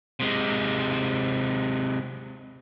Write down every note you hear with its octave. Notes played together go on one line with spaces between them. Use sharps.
C3 G#3